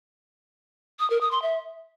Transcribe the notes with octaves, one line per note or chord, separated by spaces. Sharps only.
D#6
A#4
D#6
C6
E5